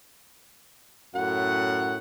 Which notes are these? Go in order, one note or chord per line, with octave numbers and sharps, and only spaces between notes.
F#2 A2 F#5